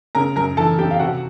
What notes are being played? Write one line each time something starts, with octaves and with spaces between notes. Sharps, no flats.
C#3 A#4 A#5
F#2 A#4 A#5
E3 A4 A5
F#2 G4 G5
F5
C3 F#4 F#5